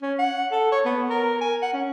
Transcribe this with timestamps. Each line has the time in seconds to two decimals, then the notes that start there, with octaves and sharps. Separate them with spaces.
0.02 C#4
0.19 F#5
0.52 A4
0.72 C#5
0.85 B3
1.10 A#4
1.41 G#5
1.62 F#5
1.74 C#4